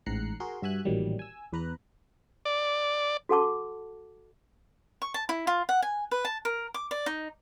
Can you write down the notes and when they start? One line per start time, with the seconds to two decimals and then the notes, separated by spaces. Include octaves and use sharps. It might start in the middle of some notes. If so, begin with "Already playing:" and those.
0.06 A1 G#2 A#5 F#6 C7 C#7
0.40 F#4 G#4 A#4 C6
0.62 G2 F#4 E5 G#5 F#6
0.85 A1 A#2 D#3 F#3 G3
1.19 G#5 E6
1.53 E2 B4 A#5 F#6
2.45 D5
3.29 F#4 A4 F#5 A5 D6
5.02 C#6
5.14 A5
5.29 E4
5.47 F4
5.69 F#5
5.82 G#5
6.11 B4
6.25 A5
6.45 A#4
6.74 D6
6.91 D5
7.06 D#4